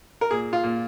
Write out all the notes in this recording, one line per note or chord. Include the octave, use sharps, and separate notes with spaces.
A#4
A#2 G#4
F4
A#2